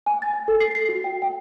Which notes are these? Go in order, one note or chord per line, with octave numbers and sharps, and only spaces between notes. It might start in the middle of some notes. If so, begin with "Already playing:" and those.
G#5
A6
G#5
A4
C7
C7
F#4
G5
G5